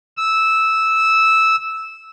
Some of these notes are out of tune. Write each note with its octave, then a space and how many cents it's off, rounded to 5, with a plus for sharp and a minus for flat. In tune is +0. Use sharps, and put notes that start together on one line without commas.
E6 -10